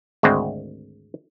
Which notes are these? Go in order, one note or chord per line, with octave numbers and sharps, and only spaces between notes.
G#1 D2 G#3 C4